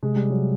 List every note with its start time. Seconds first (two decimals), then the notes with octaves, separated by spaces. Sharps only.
0.03 C3 G#3
0.16 G3
0.30 F#3